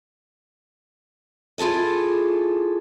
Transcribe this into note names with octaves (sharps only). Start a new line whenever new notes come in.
E4 F4 G#4 A4 D#5